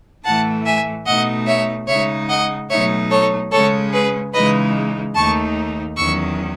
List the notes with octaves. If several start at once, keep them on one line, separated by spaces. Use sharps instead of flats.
A2 E3 A3 F#5 A5
E5 G#5
B2 A3 D#4 D#5 F#5
C#5 E5
C#3 G#3 D#4 C#5 E5
D#5 F#5
B2 F#3 A3 D#4 C#5 E5
A4 C#5
C#3 G#3 C#4 A4 C#5
G#4 B4
C#3 E3 G#3 D#4 B4 D#5
D#2 D#3 A3 D#4 A5 C#6
E2 D#3 F#3 C#4 C#6 E6